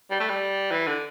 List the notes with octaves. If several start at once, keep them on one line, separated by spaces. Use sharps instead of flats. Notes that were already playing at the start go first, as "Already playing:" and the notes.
G3
A3
G3
E3
D3